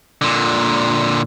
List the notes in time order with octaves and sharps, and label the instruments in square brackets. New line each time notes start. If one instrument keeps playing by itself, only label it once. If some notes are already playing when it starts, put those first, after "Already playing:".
[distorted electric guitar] A#2 D3